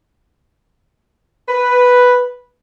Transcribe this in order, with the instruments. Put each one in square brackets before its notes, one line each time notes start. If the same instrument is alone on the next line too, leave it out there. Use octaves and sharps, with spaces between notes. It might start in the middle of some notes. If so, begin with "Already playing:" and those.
[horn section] B4